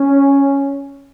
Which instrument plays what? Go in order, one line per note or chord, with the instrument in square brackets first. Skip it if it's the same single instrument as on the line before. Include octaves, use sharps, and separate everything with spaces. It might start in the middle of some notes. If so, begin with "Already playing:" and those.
Already playing: [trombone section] C#4